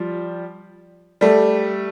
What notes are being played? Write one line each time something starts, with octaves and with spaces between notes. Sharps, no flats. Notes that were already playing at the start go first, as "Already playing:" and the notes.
Already playing: F3 G3
G3 A3